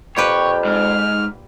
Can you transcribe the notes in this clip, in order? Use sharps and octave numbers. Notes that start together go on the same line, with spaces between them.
F2 A#2 G4 B4 C#5 G5
G#2 F6